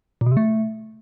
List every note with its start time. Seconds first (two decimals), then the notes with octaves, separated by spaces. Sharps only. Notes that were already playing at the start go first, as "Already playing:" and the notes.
0.21 A#2
0.26 B2
0.32 C3
0.37 A3